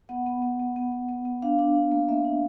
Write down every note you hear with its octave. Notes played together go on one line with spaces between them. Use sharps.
B3 F#5
B3
B3
B3
B3
B3
B3
B3
D4 F5
D4
D4
A#3
A#3 E5
D4